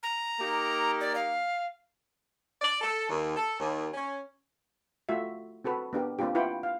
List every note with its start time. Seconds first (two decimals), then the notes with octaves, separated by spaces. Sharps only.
0.03 A#5
0.40 A#3 D#4 G4
1.01 D5
1.15 F5
2.61 D5
2.81 A4
3.09 D#2
3.36 A4
3.60 D#2
3.93 C#4
5.09 A3 F4 F#4 E5
5.64 C4 F#4 A4 B4
5.93 B3 D4 G4 A#4
6.19 A#3 C4 D4 F4 G4
6.35 E4 F4 B4 F#5 G5
6.63 F5